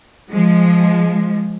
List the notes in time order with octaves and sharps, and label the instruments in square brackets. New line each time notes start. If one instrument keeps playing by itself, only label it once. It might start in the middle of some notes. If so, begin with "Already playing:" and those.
[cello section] F3 G#3